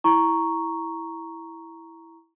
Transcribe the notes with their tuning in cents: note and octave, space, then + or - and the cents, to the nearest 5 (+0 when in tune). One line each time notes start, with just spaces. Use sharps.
E4 +0 A#5 +0 C#6 +0